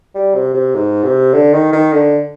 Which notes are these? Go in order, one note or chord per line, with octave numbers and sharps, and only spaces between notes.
G3
C3
C3
G#2
C3
D3
D#3
D#3
D3